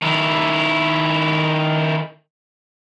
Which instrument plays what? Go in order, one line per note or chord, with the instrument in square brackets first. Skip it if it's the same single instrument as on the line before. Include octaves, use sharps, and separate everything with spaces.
[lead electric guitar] D#3 E4